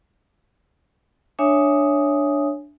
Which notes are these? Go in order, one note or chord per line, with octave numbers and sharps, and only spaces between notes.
D4 C#5 E5 G#5 D#6